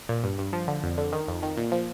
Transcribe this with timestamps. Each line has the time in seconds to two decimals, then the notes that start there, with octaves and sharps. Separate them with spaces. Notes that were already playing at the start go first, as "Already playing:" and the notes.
0.09 A#2
0.24 G2
0.38 G2
0.53 F3
0.68 D3
0.83 F2
0.98 D3
1.12 D#3
1.28 F2
1.43 D#3
1.57 A#2
1.72 F3